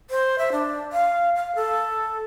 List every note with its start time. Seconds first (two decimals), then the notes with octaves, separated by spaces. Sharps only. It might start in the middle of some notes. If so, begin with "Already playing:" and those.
0.10 C5
0.38 E5
0.52 D4
0.92 F5
1.36 F5
1.55 A4